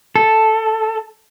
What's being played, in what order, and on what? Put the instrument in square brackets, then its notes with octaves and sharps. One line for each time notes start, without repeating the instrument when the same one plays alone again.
[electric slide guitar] A4